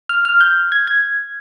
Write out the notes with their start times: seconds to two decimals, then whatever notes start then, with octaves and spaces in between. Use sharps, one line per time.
0.09 F6
0.25 F6
0.41 G6
0.72 G#6
0.87 G#6